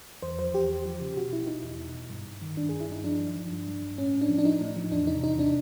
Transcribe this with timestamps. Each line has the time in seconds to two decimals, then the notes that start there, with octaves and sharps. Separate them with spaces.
0.22 E2 C5
0.39 F3 C5
0.54 E2 G4
0.70 E2
0.85 F3
1.00 C#3
1.16 B2 F#4
1.32 B2 E4
1.47 B2 D#4
1.63 E2
1.78 B2
1.95 B2
2.10 G2
2.26 G2
2.41 D#3
2.57 G2 D4
2.69 G2 G#4
2.80 E4
2.88 G2 D#4
3.04 F3 D4
3.20 F3
3.36 F3
3.51 G2
3.67 G2
3.83 G2
3.98 A2 C#4
4.14 A2
4.21 D4
4.29 F3
4.38 D4
4.45 F3 D#4
4.61 A2
4.76 F3
4.91 E2 D4
5.07 C3 D#4
5.23 E2 D#4
5.39 C3 D4